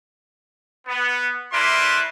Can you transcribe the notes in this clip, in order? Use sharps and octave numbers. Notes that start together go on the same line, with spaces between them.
B3
A3 E4 A#4 B4 D5 C6